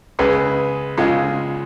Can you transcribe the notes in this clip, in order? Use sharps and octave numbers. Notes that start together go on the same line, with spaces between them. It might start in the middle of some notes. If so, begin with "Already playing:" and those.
C#2 C#3 G#3 B4
C#2 C#3 G#3 F4